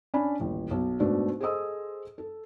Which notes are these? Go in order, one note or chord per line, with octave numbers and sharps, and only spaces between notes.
C#4 D4 G#5 B5
D#1 A1
B1
G#2 B2 A3 D4
G#4 A4 C5 D#5 D#6 E6
A4